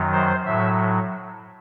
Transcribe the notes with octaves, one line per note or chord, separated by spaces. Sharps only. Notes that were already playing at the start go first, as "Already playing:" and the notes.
Already playing: F#2 D#3 F#3
C5
A2 F#3 E5